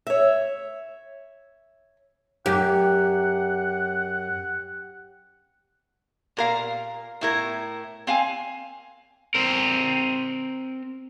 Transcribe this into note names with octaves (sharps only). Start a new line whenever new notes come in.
C#5 E5
F#2 G4 F#5
A#2 A#4 F5
A2 E4 A#4
C4 F5 G#5
C4 A#4